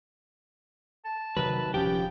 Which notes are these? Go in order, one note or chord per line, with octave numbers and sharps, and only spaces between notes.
A5
C3 D#3 F#3 B4
D#1 F3 C#4 G4 G5